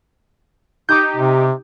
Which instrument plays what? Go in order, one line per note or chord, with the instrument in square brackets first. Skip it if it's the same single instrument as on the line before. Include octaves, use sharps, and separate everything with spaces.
[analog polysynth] D#4 G4 [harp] D6 D#6 G6
[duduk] C3